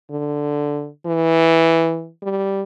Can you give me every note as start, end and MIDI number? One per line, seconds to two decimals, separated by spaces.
0.10 0.88 50
1.06 2.09 52
2.22 2.62 55